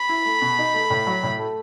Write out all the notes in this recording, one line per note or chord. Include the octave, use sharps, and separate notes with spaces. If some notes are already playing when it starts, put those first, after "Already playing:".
Already playing: B5
E4
A3
B2
D#4
A3
A2
F#3
A2
A3